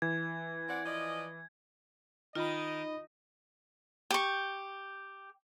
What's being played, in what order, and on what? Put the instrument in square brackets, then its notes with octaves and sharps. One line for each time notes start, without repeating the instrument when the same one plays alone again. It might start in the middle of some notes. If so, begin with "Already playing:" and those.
[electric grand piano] E3 [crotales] G#6
[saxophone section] C4 D5 F#5
F3 D5 D#5
[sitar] D#3 [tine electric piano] D#4 B5 [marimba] F4 [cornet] D#5
[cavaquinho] G4 C#6